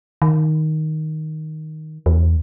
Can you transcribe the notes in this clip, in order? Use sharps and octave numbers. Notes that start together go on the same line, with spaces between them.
D#3
E2